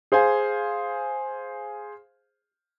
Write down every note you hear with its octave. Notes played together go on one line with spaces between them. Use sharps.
G#4 C5 F5 G#5